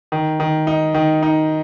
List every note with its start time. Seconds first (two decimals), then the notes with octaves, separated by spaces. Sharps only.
0.12 D#3
0.40 D#3
0.67 D#4
0.94 D#3
1.23 D#4